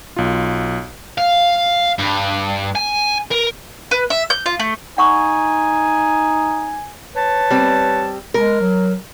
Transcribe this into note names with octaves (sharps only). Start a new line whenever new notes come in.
B1 F4
F5
G2
G#5
A#4
B4
E5
G6
F4
A3
D#4 F#5 G#5 C#6 D#6
B4 C#5 A5
G3 C4
G#3 A#4
F#3